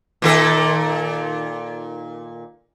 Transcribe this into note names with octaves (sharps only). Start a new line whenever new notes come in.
A#2 D#3 A4